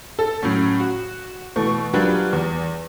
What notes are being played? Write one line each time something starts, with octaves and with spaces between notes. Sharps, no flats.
A4
A2 F#3 C#4
F#4
B2 E3 A3 C#6
F#3 G3 D4 F4 A#4 B4
E2